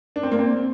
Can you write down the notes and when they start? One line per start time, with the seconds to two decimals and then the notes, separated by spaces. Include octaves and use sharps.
0.16 D4
0.23 C4
0.32 A#3
0.39 C4